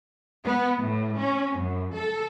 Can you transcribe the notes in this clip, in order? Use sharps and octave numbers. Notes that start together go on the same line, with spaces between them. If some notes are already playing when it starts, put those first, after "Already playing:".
B3
A2
C#4
F#2
A4